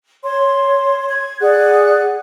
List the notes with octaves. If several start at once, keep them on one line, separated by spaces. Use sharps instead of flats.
C#5 C6
G#6
G#4 D5 F#5 F#6